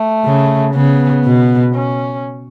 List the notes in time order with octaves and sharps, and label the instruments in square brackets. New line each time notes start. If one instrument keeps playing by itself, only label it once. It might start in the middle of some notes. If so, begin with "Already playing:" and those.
Already playing: [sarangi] A3
[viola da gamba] C#3
[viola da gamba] C#3 [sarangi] B3
[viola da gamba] B2
[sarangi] C#4